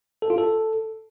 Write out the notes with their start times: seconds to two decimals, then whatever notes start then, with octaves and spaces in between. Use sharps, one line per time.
0.22 A4
0.30 F4
0.38 A4